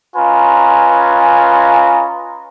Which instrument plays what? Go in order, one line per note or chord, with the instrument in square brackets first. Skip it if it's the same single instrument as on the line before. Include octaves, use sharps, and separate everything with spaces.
[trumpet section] C#4 F4 B4 D#5 G#5 A#5